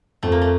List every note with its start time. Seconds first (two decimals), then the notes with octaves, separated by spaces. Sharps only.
0.23 F2 A3
0.32 A#3
0.41 A3